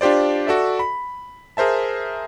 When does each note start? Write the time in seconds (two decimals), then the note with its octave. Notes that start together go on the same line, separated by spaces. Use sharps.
0.01 D4 F4 G4 C5 D5
0.47 F#4 A4 D5 E5
0.79 B5
1.57 G#4 A#4 C5 E5 A5